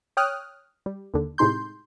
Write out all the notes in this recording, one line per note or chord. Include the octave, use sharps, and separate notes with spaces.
C#5 G5 D#6 F6 F#6
G3
D#2 D3
A2 C3 G#3 D#4 C6 G6